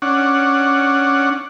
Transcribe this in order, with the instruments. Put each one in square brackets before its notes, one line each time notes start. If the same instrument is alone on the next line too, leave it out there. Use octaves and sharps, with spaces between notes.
[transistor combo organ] C#4 D4 F#5